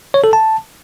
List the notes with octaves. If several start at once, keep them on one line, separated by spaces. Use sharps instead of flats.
C#5
A4
A5